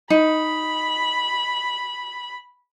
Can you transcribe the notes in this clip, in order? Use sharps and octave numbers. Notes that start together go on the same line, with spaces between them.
D#4 B5